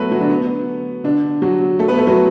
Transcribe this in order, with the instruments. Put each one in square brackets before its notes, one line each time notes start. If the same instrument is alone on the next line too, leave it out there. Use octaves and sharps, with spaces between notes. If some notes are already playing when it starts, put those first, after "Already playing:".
Already playing: [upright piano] F#3 A3 B3 F#4 A4 B4
F#3 F#4
D3 D4
B3
D3 D4
F#3 F#4
A3 A4
B3 B4
A3 A4
F#3 F#4